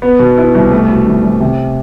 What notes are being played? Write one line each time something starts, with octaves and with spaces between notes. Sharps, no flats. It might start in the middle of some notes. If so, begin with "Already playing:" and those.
B3
B2
E4
C2
A3
B2
C2
C2
C3